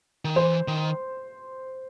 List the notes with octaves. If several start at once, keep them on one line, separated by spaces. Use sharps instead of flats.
D#3
E3 C5
D#3